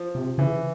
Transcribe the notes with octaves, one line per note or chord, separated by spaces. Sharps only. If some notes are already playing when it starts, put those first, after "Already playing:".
Already playing: F3
C3
C#3 E3